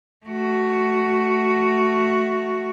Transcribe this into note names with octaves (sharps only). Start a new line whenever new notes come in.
A3 F#4